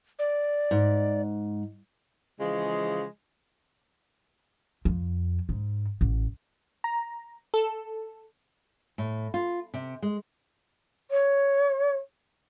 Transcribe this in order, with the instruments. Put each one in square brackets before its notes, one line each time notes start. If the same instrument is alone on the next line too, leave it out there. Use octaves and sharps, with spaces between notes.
[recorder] D5
[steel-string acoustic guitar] G#2
[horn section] C#3 E3 F3 G#3
[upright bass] F2
G#2
A1
[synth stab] A#5
A4
[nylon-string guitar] A2
F4
C3
G#3
[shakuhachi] C#5